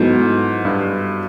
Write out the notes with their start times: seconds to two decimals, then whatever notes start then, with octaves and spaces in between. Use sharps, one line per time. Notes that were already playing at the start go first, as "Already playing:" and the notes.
Already playing: G#2 F#3 B3 E4 A4
0.65 G2